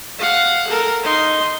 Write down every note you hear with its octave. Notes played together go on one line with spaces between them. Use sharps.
F5 F#5
A4 A#4
D#4 C6